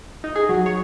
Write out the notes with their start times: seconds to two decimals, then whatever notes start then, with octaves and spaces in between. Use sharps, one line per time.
0.24 D#4
0.36 G#4
0.49 F#3
0.66 C#5